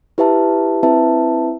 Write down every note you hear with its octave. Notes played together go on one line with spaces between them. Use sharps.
E4 G4 B4 E5 A5
C4 E4 B4 E5 A5